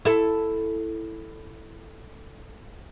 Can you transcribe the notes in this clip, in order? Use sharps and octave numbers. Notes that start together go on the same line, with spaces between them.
E4 A4